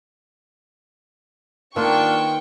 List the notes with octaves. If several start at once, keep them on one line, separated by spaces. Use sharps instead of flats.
D#3 A#3 B3 D4 F4 G5 C#6 E6